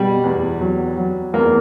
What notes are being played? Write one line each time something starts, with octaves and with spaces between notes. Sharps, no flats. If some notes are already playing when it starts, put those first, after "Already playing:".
Already playing: B2 G3
E2
F#3
F#3
E2 A#3